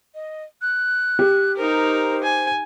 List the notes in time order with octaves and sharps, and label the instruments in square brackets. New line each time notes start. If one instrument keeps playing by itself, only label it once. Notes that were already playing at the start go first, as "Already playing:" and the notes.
[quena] D#5
F#6
[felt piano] G4
[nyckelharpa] D#4 A#4 [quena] C5
[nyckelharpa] G#5